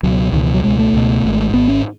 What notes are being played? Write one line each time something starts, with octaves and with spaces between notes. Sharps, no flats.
C#2 B2 F#3
C#2 B2 D#3
E3
F#3
C#2 B2 G#3
A3
C#2 B2
G#1 G#2
G#1 G#2 B3
C#4